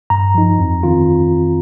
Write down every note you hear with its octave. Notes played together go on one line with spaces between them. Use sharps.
G2 A#5
F3 D#4
F2
D#3 C4 F4